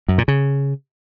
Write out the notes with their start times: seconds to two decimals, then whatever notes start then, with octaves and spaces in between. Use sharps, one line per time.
0.08 F#2
0.18 A#2
0.28 C#3